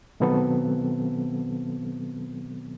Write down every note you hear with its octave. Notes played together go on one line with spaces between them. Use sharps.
B2 D#3 F#3 B3 C4 A4